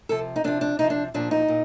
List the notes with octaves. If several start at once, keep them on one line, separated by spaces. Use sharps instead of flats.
C3 F3 A4
D#4
C3 F3 D4
D4
C3 F3 D#4
D4
A#2 F3 D4
D#4
A#2